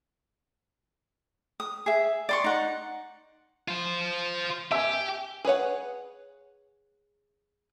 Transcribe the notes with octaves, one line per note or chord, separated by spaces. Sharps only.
D#6
G#4 E5
D5 C6 C#6
D#4 F#5
F4 C5
G4 E5 G#5
G#4 B4 C#5 F#5